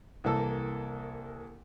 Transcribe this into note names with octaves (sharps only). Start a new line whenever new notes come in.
C2 E3 A#3 A4 E6